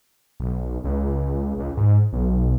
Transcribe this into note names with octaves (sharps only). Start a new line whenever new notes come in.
B1
C#2
C#2
G#2
B1